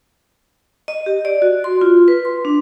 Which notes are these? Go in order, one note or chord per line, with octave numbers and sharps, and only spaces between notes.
D#5
G4
D5
F#4
C6
F4
B4
C6
D4